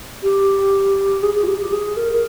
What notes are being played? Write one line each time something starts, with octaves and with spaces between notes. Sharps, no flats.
G4
G#4
G#4
F4
G4
G4
G#4
A#4
A#4